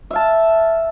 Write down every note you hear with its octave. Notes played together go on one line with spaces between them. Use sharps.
E5 F5 A5